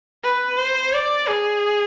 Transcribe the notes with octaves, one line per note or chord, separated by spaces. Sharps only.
B4
C5
D5
G#4